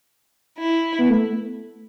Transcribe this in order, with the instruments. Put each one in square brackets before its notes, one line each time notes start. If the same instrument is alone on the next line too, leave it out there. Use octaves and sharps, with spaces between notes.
[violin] E4
[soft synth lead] B3
A3